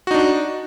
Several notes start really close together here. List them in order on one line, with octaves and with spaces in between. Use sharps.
F#4 D#4 D4